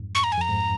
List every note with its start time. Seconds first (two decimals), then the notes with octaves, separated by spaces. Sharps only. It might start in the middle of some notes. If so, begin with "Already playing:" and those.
Already playing: F2 G#2
0.15 C#6
0.24 A#5
0.32 G#5
0.37 F2 A#5
0.49 G#2